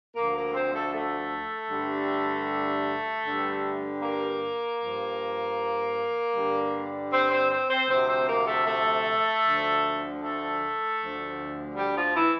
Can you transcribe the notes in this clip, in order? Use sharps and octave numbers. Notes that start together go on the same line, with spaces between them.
D2 D3 F3 A#3 A#4
A#3 A#4
C4 C5
A3 A4
A3 A4
G2 D3 G3
G2 D3 G3
A#3 A#4
G2 F3
G2 D3 G3
C4 C5
C4 C5
C4 C5
C4 C5
D2 C3 F3 C4 C5
C4 C5
A#3 A#4
A3 A4
A3 A4
D2 D3 F3
A3 A4
D2 D3 F3
G3 G4
F3 F4
E3 E4